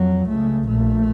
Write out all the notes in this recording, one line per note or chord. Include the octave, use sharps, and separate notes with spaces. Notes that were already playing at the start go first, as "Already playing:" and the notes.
Already playing: F2 F3 F#3
C#2 C#3 A3
A#1 A#2 A3